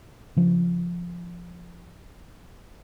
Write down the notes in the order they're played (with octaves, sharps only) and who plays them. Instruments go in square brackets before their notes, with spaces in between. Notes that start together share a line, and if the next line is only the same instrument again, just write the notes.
[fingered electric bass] C#3 F3 D4